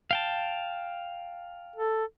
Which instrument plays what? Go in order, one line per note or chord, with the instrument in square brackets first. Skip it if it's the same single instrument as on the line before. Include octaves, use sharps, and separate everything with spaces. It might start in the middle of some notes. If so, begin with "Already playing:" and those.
[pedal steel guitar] F5 G5 A5
[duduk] A4